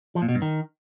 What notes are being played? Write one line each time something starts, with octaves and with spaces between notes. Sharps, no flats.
F3
A#2
B2
G2
D#3